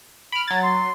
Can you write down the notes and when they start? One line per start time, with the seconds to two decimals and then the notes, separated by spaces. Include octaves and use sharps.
0.32 B5 F6 D7
0.48 F#3 G#6 A6
0.63 C6